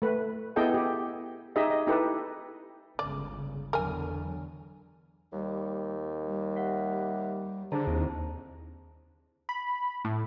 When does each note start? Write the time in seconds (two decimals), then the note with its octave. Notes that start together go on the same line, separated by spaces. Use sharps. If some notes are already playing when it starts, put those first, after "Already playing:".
0.02 A3 B4
0.56 B3 E4 G#4 A4 D#5 G5
0.74 G4
1.56 D#4 G4 G#4 D#5 E5
1.70 D#5
1.87 D#4 E4 G4 A4 B4
2.99 G1 C#2 C#3 D5
3.73 E2 D3 F#3 A#4 G#5
5.33 D#2 G3
6.27 G3
6.56 E5 F#5 B6
7.72 D3 G#4 C5 A5 A#5
7.87 D#2 C4 E4
9.49 B5
10.05 A2